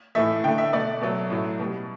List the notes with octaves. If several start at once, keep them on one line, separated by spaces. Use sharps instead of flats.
A2 E3 A3 E5
D3 A3 G5
E5
B2 A3 D5
B2 F#3 A3
A2 F#3 A3
B2 G3